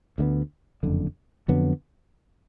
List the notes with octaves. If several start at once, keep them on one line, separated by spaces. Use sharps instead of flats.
D2 D3 G#3 B3
F#1 F2 D3
F2 D3 F#3 B3